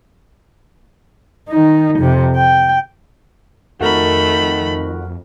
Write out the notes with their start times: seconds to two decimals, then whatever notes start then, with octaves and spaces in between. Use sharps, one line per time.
1.49 D#3 D#4
1.99 F2 C3
2.36 G5
3.81 F2 D#3 A3 F#4 A#4 B5